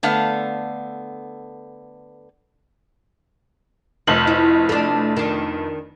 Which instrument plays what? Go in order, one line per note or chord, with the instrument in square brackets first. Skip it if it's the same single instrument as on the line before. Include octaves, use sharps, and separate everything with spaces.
[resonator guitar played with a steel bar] D3 A3 B3 F5 A5
[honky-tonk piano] F1 F2 F#7 [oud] D#3
[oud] E4
A3 D4
D#3 D4